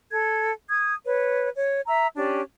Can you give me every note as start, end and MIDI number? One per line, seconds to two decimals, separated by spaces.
0.11 0.51 69
0.11 0.51 92
0.70 0.95 87
0.70 0.95 92
1.05 1.48 71
1.05 1.48 73
1.54 1.79 73
1.87 2.08 76
1.87 2.08 82
1.87 2.08 88
2.16 2.41 61
2.16 2.41 62
2.16 2.41 67
2.16 2.41 74